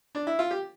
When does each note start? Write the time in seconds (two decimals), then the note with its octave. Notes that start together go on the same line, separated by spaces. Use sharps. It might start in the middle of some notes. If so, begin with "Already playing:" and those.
0.15 D4
0.27 E4
0.39 F4
0.51 G4